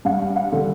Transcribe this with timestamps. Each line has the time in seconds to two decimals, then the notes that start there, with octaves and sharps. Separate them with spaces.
0.05 G2 F#5
0.36 F#5
0.52 D3